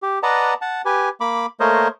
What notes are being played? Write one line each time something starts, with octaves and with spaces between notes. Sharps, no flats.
G4
B4 D5 D#5 F#5 A5 A#5
F#5 A5
G4 B4 G#5
A#3 B5 D6
A3 A#3 A#4 C5 C#5 D#5